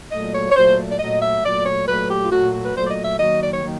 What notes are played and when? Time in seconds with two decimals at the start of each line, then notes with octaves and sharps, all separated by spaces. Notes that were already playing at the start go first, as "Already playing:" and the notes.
0.11 A#2 F#3 A3 D#5
0.34 C#5
0.50 C#5
0.55 A#2 F#3 A3 C5
0.90 D5
0.99 A#2 F#3 A3 D#5
1.21 E5
1.43 A#2 F#3 A3 D5
1.65 C#5
1.87 A#2 F#3 A3 B4
2.08 G4
2.23 F4
2.30 A#2 F#3 A3 F#4
2.52 F#4
2.64 B4
2.74 A#2 F#3 A3 C5
2.85 D5
2.89 D#5
3.03 E5
3.18 D#3 F#3 A#3 D#5
3.40 D5
3.52 C#5
3.62 D#3 F#3 A#3